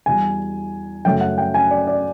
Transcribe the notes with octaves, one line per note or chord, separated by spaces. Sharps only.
E2 B2 G3 G#5
F#2 C#3 F#3 A3 G5
F#5
G5
G#5
D5
D5